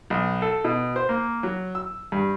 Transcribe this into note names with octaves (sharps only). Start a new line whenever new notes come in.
B1
A4
B2
C5
A#3
F#3
E6
G2